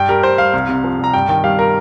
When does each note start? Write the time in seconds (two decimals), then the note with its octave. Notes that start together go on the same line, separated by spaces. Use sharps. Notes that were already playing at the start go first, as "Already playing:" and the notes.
Already playing: G2 G5
0.09 G3 A#4
0.23 G2 C5
0.38 G3 F5
0.53 C2
0.69 C3
0.84 F3
0.99 C2 A#5
1.14 G2 G5
1.28 D#3 G5
1.44 G3 F5
1.59 A#4